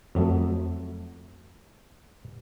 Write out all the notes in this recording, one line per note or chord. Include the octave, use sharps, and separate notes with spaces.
F2 F#3 A3